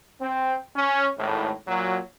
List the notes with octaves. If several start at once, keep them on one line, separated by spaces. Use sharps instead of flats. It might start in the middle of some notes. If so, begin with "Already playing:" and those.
C4
C#4
G#1 A2
A#2 F#3